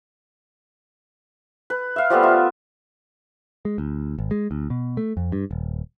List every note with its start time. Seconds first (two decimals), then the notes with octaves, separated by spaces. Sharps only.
1.70 B4
1.96 E5 F5
2.10 F3 G3 A3 B3
2.23 F4 E5
3.65 G#3
3.78 D2
4.18 G#1
4.31 G#3
4.51 D2
4.70 B2
4.97 A3
5.17 F2
5.32 G2
5.51 D#1